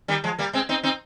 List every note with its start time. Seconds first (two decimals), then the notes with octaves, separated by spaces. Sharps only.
0.08 D#3 G3
0.24 F3 G#3
0.38 G3 A#3
0.53 G#3 C4
0.69 C4 D#4
0.83 C4 D#4